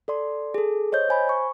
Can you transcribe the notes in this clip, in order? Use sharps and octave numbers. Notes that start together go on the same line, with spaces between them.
A4 D5 C6
G#4 A4
C5 C#5 D#5 G6
C5 G#5 B5
C#6